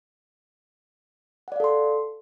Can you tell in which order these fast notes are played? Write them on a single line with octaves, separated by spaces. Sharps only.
F#5 D5 F5 A4 C6